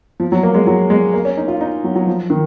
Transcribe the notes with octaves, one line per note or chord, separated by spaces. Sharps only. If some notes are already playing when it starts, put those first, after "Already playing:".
F3
F#3
A#3
G#3
F#3
G#3
A#3
C#4
D#4
F4
D#4
F#3
F#3
F3
D#3